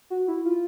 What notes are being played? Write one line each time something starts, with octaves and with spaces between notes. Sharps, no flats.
F#4
E4
F4